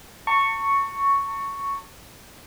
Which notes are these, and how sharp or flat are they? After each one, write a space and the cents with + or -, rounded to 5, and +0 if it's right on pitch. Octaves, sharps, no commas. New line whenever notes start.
A5 +40 C#6 +0